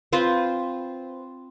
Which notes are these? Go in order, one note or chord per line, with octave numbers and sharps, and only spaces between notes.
C4 F4 B4 C5